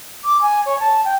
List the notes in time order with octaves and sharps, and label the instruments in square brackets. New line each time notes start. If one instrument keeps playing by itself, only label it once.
[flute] D6
G#5
C#5
A5
G5